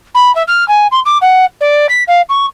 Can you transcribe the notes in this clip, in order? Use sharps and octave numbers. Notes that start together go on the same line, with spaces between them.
B5
E5
F6
G#5
C6
D6
F#5
D5
B6
F5
C#6